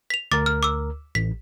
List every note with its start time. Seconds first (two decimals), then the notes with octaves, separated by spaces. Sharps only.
0.10 B6 F7
0.32 D2 A#4 D6 A6
0.46 F6
0.63 D6 E6
1.15 A1 B6